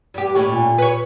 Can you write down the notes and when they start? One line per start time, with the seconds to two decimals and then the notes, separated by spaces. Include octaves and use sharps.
0.14 G2 G4
0.35 D#2 A2 C#4
0.49 A#2
0.78 B4 C#5